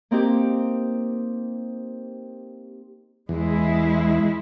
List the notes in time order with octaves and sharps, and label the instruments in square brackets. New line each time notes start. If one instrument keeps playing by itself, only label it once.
[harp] A#3 C4 D#4 G4
[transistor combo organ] E2 [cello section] G#3 E4